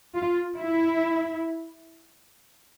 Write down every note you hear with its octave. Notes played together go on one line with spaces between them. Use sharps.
F4
E4